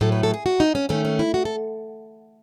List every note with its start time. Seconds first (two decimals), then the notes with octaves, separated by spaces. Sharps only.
0.01 A2 F#3 A3 A4
0.12 B4
0.23 A4
0.34 G#4
0.46 F#4
0.60 D#4
0.75 C#4
0.89 D#3 A3 C#4
1.05 C#4
1.19 E4
1.34 F#4
1.45 A4